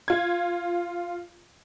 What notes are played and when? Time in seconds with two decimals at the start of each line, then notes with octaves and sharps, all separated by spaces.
0.08 F4 G#6